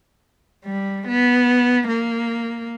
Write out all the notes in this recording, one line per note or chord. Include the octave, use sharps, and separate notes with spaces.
G3
B3
A#3